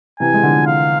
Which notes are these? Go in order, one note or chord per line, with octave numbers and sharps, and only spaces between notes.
C3 E3 G#5
G#3
D3 F3
F5